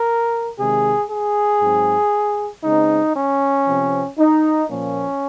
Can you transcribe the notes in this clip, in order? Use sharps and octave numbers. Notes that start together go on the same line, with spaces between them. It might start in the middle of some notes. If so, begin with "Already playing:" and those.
Already playing: A#4
C3 D#3 G#3 G#4
G#4
G#2 F#3 C4
C#3 G#3 C4 D#4
C#4
C3 F3 C4
D#4
A#2 F3 A#3 C#4